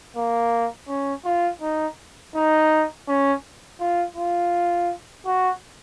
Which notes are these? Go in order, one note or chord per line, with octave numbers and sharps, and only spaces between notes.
A#3
C#4
F4
D#4
D#4
C#4
F4
F4
F#4